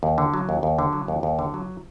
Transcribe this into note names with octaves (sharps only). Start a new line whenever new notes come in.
D#2
D3
F#3
D#2
D#2
D3
F#3
D#2
D#2
D3
F#3